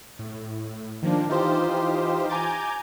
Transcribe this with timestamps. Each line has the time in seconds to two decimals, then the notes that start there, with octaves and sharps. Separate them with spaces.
0.19 A2
1.03 D#3 F3 A#3 D4
1.29 E3 D#4 F4 G4 C5
2.29 G#5 A#5 D6 G6 A6